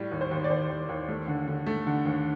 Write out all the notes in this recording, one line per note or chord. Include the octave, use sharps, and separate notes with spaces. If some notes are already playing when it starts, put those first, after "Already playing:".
Already playing: A2 G3
D#2
C5
D#2
D5
D#2 C5
D#2
D#2
A3
D3
D3
A3
D3
D#2